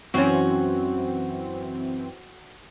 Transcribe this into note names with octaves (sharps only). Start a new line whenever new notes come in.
F#2 E3 C4 C#4 F#4